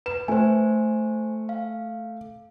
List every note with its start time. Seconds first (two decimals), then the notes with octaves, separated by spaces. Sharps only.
0.06 B4 E7
0.28 A3 C5 G#5
1.49 F5